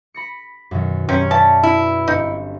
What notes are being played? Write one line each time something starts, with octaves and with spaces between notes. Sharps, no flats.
B5 A#6 C#7
F#2 B2 D#3
F#2 C3 C#4
D5 E5 A5 B5
E4 B4
G1 C4 D#4 C#7